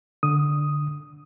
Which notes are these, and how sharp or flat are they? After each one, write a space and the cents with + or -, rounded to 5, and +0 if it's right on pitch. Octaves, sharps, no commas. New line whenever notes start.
D3 +0 D#6 +0